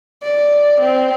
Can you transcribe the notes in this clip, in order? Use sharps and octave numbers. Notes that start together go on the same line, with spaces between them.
D5
C4